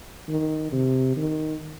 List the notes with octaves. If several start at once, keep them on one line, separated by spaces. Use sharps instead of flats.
D#3
C3
D#3